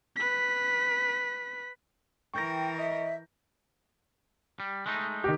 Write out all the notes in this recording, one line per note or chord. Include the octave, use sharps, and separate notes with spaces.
B4 B6
E3 A#4 G5 C#6 G6 A#6
D#5 E5
G3
G#3 A3 D#4
D#3 G4